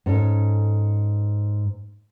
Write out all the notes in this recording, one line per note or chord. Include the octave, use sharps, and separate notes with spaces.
G#2 C#4 A4